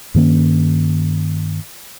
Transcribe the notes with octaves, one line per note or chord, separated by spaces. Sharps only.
G2 D#3 A#3 C#4